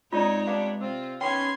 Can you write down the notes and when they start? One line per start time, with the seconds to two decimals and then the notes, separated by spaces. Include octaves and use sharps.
0.13 G#2 G#3 C4 D#4 F4 C#5 D5 A#5
0.47 G3 B3 D4 F5
0.81 C3 C4 F4
1.21 D#3 B3 C#4 G5 B5 C6 G#6